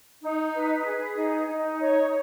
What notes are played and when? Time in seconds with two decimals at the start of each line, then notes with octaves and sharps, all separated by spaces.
0.23 D#4
0.55 B4
0.85 G#4
1.17 D#4
1.49 D#4
1.80 C#5